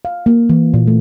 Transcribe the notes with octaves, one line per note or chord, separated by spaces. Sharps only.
F5
A#3
E3
A#2
A3